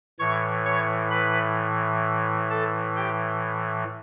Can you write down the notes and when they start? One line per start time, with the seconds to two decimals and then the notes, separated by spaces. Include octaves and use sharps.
0.19 A2 E3 C#5 C#6
0.65 C#5 C#6
1.11 B4 B5
2.50 A4 A5
2.96 G4 G5